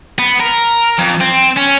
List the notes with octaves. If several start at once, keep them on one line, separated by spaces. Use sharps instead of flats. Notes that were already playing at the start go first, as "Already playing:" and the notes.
B3
A#4
F2
C4
C#4